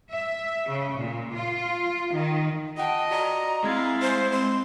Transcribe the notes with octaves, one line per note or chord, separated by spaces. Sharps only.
E5
C#3
A#2
F4
D#3
F4 D#5 F#5 G5 A5
F#4 D5 A#5 C#7
G#3 C4 E4 F5 G#6 A6
C5
C4 C5 C6